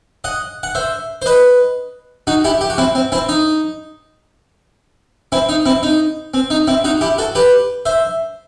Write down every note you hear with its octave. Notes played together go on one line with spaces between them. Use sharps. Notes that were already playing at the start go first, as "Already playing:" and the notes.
D#5 F#5
F#5
C5 E5
C5
B4 D#5
D#4 F#4
E4 G4
G4
F#4
C4 E4
C4
C4 E4
D#4
C4 E4
D#4
C4 E4
D#4
C4
D#4
C4 E4
D#4 F#4
E4 G4
F#4 A4
G4 B4
C5 E5